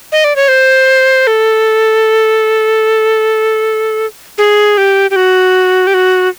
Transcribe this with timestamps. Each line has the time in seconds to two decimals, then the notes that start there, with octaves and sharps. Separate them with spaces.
0.12 D#5
0.24 D5
0.36 C#5
0.48 C5
1.27 A4
4.38 G#4
4.78 G4
5.11 G4
5.16 F#4
5.87 G4
5.94 F#4